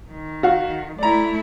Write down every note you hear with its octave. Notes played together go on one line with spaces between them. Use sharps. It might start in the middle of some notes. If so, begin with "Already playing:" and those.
D#3
F#4 F5
A3 E4 D5 A#5